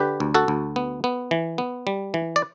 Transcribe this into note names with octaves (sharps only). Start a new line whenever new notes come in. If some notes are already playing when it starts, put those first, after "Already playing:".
Already playing: D3 G4 B4
D2
F#4 A4
D2
B3
B3
E3
B3
G3
E3
D5